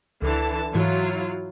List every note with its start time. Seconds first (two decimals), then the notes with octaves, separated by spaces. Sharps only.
0.22 C#2 D3 E3 A5
0.75 G#2 E3 F#3 E4 F4